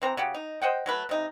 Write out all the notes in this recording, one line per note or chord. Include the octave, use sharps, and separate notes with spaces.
E3 C4 A#5
C#3 F#4 G4
D#4
C5 D#5 F#5 G5
F#3 A3 B4
C3 D#4